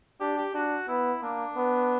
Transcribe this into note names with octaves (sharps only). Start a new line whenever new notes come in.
D4 G4
G4
D4 F#4
B3 E4
A#3 D4
B3